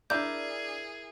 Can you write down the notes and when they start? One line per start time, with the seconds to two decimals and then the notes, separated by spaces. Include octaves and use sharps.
0.10 D4 E4 G#4 A#4 D5 D6 G6